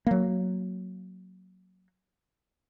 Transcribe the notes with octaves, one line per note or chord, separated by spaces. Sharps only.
F#3 A#3